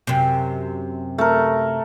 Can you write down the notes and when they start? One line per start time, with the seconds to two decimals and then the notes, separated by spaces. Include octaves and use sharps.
0.07 F#2 C3
1.18 A3 A#4